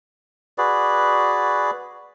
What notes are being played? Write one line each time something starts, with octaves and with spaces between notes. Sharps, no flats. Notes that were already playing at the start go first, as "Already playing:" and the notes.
F#4 G#4 B4 D5